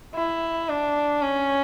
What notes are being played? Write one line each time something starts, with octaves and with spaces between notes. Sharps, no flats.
E4
D4
C#4